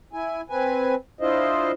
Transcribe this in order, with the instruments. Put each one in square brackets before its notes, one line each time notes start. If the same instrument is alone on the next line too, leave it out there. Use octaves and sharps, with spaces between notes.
[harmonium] E4 G#5
C4 B4 G#5
D4 E4 F4 C5 D#5